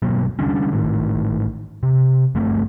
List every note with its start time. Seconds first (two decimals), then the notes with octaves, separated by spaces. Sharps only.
0.02 G1 B2 F#3 A#3
0.39 D3 G3 C#4 D4
0.71 G#1 A2 D#3
1.83 C3
2.35 G1 A3 C4